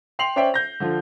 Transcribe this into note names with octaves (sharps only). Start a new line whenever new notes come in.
G5 C6 C7 F7 F#7
C#4 C5 D5 E5 G5
G6 A#6
D3 F3 F4